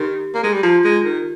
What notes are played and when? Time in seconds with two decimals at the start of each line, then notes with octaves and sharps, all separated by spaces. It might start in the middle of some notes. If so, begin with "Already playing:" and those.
Already playing: D#3 G4
0.34 A#3
0.44 G#3
0.53 G3
0.63 F3 F4
0.84 G#3
1.05 D#3